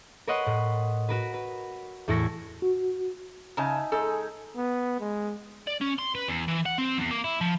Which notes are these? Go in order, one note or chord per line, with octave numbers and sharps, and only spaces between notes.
A#4 B4 C#5 D#5 F#5 C6
A2
F#4 A#4 B4
B4
E2 A2 E4 A4 C#6 A#6
F#4
C#3 D#4 E5 G#5 A5
G#3 D#4 A4
B3
G#3
D5
C#4
C6
B4
E2
E3
F#5
C4
E2
A#3
E4
F3